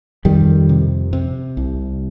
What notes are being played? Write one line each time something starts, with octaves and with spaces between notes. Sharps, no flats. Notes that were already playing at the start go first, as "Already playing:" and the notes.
F2 D#3 G3
C3
C3
C2